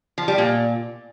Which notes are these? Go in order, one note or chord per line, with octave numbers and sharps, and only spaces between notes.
F3
G3
A#2